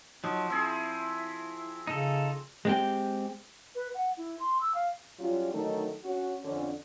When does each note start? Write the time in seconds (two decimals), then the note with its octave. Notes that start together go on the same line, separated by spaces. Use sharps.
0.24 F3 F#3 D#4
0.50 C4 E4 G#4
1.87 C#3 D#4 A4
2.65 G#3 C4 G4
3.75 B4
3.94 F#5
4.17 E4
4.40 C6
4.61 E6
4.75 F5
5.19 F#3 G3 C#4 F4
5.53 D3 D#3 F#3 A3 D#4 A4
6.04 C#4 F#4
6.44 F2 D3 C#4